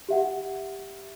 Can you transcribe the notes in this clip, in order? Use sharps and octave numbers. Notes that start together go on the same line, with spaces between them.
G4 E5 F#5